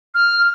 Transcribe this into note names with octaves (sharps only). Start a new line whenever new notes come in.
F6